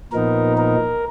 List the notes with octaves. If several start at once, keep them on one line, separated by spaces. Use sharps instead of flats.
A#2 F3 B3 D#4 A#4
A#4